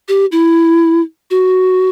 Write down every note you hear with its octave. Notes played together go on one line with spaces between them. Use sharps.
G4
E4
F#4